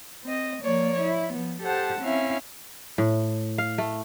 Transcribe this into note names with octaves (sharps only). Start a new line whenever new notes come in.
C4 D#5
F3 A#3 C#5 D5
E4
F3 B3
G4 A4 C5 F#5 A5
C4 C#4 E4 E5 F5
A2
F5
A3